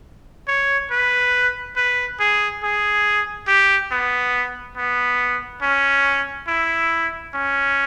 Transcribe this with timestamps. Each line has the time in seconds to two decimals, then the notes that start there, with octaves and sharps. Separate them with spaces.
0.48 C#5
0.91 B4
1.76 B4
2.20 G#4
2.63 G#4
3.48 G4
3.91 B3
4.77 B3
5.62 C#4
6.48 E4
7.34 C#4